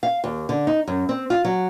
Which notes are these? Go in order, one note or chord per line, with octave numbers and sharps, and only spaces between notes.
F5
D#2
D3
D#4
F#2
C4
F4
F#3